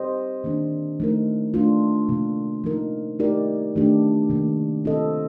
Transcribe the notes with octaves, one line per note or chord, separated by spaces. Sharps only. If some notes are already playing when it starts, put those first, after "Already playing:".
Already playing: C4 G4 C5 D#5
D#3 A#3 D4
F3 A3 D#4 A#4
A3 D4 F4
C3 F3 A#3
F3 A#3 D#4 A#4
A3 D#4 G4 A#4 D5
D#3 A3 D4 G4
C3 D#3 A#3
C4 F4 A4 D#5